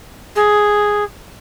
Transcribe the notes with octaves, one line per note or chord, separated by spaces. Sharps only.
G#4